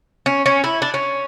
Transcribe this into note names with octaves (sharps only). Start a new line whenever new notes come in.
C#4
C#4
E4
D4
C#4